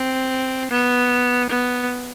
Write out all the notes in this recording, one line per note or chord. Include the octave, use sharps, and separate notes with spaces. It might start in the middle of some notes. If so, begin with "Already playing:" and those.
Already playing: C4
B3
B3